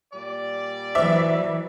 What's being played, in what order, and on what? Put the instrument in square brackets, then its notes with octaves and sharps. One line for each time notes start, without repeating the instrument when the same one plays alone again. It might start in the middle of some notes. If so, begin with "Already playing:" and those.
[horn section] A#2 G3 D5
[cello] E3 F#3 [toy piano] C5 D6 [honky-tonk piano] E5